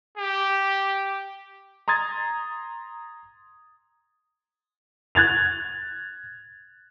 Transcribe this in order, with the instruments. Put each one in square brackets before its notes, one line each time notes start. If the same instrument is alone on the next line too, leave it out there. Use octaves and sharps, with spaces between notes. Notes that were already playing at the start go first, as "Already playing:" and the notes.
[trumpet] G4
[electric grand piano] A#5 C6 D#6 G#6 A6
[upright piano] F#6 G#6 A6 F7